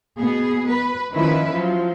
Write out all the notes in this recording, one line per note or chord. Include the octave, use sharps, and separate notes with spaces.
B2 B3 G#4
B4
D#3 F3 C#4 E4 B4
F3 F#3